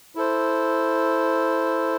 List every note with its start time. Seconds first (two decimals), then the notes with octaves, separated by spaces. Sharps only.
0.15 E4 A4 C5